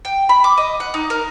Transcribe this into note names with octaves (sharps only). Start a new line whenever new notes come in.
G5
B5
D6
D#5
F#5
D#4
A#4